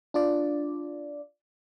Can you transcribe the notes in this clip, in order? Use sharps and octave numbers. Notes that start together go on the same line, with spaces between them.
D4 F4 D5